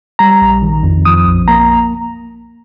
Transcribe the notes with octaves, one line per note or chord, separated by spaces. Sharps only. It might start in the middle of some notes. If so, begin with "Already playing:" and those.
G3 A#5
A#1
D#3
F2
F3 D#6
A#1
A#3 A#5